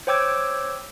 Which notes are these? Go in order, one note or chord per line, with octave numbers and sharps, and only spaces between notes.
C5 C#5 G5 D6 E6 G#6